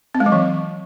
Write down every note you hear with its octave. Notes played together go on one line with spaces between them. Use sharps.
C4
G#3
F#3
E3